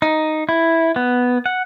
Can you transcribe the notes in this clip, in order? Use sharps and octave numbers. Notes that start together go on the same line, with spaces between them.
D#4
E4
B3
F#5